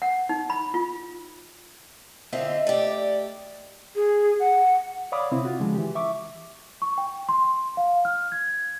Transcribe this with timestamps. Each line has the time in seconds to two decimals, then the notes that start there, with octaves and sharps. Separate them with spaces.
0.02 F#5
0.29 D#4
0.50 B5
0.74 F4
2.33 D3 C4 F4 D#5 E5
2.67 A3 G4 D5
3.96 G#4
4.40 F#5
5.12 C#5 D5 F5 B5 D6 D#6
5.31 C3 C4 E4
5.45 F4 F#4
5.60 C#3 F3 G#3
5.75 E3 G4
5.95 E5 C#6 D6
6.82 C#6
6.98 G5
7.29 C6
7.77 F5
8.05 F6
8.32 G#6